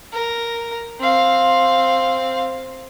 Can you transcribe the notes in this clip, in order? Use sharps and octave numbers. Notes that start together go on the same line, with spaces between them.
A#4
C4 F5